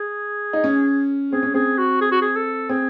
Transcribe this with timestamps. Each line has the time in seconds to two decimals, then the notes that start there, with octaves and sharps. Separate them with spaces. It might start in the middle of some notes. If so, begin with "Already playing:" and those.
Already playing: G#4
0.53 D#4
0.64 C#4
1.32 C4 G#4
1.43 C#4
1.54 C4 G#4
1.78 F#4
2.01 G#4
2.11 F#4
2.22 G#4
2.35 A4
2.69 C4 G#4